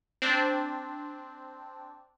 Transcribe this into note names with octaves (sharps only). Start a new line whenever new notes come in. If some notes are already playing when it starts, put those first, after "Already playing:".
C4 D4